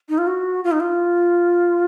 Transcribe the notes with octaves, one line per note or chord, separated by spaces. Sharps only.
D#4
F4
F#4
F4
D#4
F4